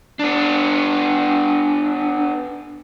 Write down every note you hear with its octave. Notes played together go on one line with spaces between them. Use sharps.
B3 D4